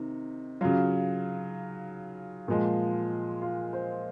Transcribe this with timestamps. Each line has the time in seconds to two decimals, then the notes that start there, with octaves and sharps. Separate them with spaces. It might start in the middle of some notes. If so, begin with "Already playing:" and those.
Already playing: C3 D#3 D#4
0.61 C#3 F#3 F4
2.48 A#2 F3 G#3
3.42 F4
3.73 C5